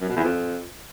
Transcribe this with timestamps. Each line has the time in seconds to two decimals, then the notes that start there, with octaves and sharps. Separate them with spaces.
0.01 F#2
0.09 B2
0.16 E2
0.24 F2